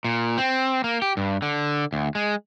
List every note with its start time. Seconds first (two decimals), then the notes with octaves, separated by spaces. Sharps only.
0.05 A#2
0.38 C4
0.84 A#3
1.02 G4
1.17 G2
1.42 D3
1.93 D2
2.15 G#3